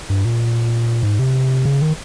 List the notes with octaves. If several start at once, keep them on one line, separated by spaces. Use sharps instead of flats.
G2
A#2
G#2
C3
C#3
D#3